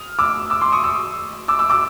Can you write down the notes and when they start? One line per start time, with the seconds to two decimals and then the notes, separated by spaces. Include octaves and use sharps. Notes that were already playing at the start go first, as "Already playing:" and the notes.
Already playing: D#6 F6
0.19 D6 E6
0.50 D6 E6
0.61 C6 D6
0.72 C#6 D#6
0.83 D6 E6
1.48 D6 E6
1.59 D6 E6
1.70 D6 E6